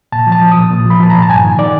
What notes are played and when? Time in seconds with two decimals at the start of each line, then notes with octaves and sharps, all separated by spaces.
0.12 A#2 A5
0.27 F3
0.32 A5
0.42 F3
0.52 A#2 D#6
0.71 A#2
0.86 F3 B5
1.00 F3 A5
1.10 A#2 A#5
1.22 A5
1.29 G2 G#5
1.44 D#3
1.59 D#3 D5